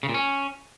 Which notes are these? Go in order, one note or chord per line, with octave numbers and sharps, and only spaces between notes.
C#3
A#2
C#4